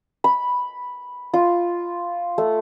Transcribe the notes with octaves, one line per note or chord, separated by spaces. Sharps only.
B5
F4
A3